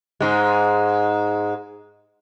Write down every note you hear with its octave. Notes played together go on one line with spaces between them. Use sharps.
G#2 G#3